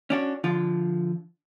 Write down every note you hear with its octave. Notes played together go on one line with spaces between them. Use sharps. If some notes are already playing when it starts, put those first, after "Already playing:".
C#4 D4 F#4
D3 F3 F4